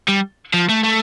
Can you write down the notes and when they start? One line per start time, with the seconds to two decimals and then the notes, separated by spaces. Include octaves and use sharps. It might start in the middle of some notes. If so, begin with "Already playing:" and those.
0.08 G3
0.54 F3
0.70 A3
0.84 A3